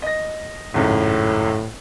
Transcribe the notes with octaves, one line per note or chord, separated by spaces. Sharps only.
D#5 A#6
G#1 C#2 F#2 A2